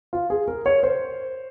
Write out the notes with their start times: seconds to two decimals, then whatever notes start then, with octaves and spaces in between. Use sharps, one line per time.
0.13 F4
0.30 G#4
0.48 A#4
0.66 C#5
0.83 C5